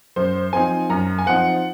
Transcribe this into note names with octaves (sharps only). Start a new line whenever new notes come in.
F#2 C5
F3 C4 D#4 G#5
F#2 A#5
G#5
F3 C4 D#4 F#5